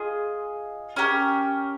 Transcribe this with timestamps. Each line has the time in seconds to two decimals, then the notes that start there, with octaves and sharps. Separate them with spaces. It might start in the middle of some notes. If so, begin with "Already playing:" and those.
Already playing: F4 G#4 D#5
0.96 C#4 G4 A#4